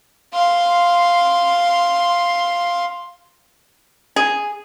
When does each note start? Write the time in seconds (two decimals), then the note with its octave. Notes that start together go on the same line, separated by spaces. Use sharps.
0.33 F5 C6
4.16 G#4